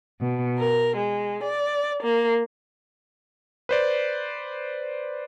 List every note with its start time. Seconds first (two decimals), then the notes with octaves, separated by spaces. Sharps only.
0.21 B2
0.59 A#4
0.96 G#3
1.44 D5
2.03 A#3
3.69 B4 C5 D5